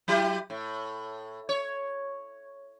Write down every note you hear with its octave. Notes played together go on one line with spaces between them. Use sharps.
F#3 E4 G4
A2
C#5